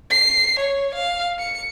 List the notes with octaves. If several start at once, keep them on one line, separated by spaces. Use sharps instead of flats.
C7
C#5
F5
C#7